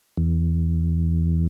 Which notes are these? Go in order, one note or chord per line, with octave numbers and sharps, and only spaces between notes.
E2